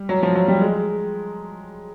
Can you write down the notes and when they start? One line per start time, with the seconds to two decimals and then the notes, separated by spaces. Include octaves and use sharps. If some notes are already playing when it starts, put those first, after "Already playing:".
Already playing: G3
0.09 F#3
0.23 F3
0.35 F#3
0.48 G3
0.61 G#3